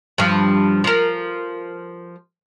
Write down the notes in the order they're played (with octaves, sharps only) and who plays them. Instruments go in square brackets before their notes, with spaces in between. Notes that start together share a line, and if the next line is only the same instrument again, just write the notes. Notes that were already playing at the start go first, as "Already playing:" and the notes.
[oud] G2 F3
F3 A#4